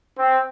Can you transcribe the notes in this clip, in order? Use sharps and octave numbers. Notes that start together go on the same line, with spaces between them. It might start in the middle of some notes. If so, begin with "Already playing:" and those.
C4